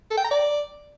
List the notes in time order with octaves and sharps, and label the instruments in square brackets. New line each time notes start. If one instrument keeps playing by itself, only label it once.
[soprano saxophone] A4
G5
A#5
D5